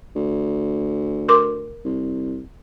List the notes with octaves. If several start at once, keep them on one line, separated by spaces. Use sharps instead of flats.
D2
A#4 C6 D6
C2